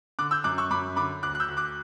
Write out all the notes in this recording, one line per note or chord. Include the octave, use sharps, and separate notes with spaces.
D3 D6 F#6
E6 G6
F#2 D6 F#6
C#6 E6
F#2 B5 D6
D3 B5 D6
D2 D6 F#6
F#6
E6 G6
D2
D6 F#6